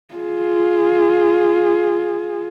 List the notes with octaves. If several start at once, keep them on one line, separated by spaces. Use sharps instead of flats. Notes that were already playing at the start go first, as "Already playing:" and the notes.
F4 G#4